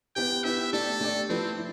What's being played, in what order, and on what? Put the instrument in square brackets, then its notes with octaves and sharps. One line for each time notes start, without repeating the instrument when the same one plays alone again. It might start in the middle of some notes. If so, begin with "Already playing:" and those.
[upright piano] B3 E4 G4 [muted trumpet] G5
[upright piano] B3 E4 G4 [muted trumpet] E5
[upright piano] A3 D4 G4 D5 [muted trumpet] A4
[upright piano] A3 D4 G4 D5
[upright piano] F3 A3 E4 B4 [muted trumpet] C4
[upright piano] E4